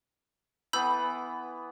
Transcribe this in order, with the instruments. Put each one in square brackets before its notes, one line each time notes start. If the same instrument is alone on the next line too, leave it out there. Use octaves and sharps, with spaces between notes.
[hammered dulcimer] E3 B3 [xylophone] B5 E6 G6